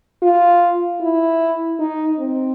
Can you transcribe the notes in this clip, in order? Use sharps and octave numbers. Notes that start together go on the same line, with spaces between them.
F4
E4
D#4
C4